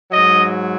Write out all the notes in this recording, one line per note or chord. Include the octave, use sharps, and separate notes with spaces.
G#2 F#3 D#5